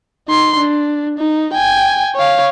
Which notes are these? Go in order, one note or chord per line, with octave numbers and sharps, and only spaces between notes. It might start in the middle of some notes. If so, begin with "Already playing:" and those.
D#4 C6
D4
D#4
G5 G#5
C#5 F5